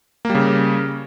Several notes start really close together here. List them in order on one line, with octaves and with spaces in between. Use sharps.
A#3 G3 C#3